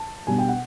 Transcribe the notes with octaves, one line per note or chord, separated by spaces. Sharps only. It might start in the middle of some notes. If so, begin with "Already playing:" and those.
Already playing: A5
B2 G3 B3 D4 G#5
G5
F#5